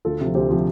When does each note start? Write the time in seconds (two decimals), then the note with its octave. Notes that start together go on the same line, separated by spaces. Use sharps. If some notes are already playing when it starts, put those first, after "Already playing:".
0.05 D2 F4 A4
0.21 C3 F3
0.35 D2 G4 C5
0.50 C3 F3